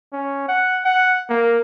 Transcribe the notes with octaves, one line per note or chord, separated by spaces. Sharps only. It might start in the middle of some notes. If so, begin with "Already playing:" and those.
C#4
F#5
F#5
A#3